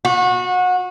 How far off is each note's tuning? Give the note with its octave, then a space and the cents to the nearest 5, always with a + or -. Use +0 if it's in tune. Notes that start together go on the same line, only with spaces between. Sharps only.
F#4 -25